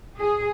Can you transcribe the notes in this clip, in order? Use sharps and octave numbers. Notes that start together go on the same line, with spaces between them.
G#4